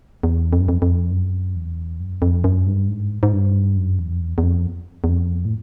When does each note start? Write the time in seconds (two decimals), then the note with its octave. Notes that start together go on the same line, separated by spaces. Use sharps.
0.23 E2
0.53 F2
0.60 F#2
0.68 F2
0.82 F2
1.11 F#2
1.56 E2
2.00 F#2
2.22 F2
2.44 F#2
2.67 G2
2.88 G#2
3.23 G#2
3.33 G2
3.77 F#2
3.99 E2
4.13 F2
4.21 E2
4.38 E2
4.43 F2
5.04 E2
5.09 F2
5.45 A2